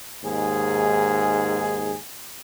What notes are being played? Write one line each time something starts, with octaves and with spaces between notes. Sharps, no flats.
D#2 G#2 G#4